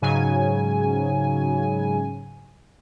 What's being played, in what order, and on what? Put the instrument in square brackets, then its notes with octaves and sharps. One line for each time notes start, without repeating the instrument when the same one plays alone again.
[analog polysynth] G#2 C#3 F#3 G#5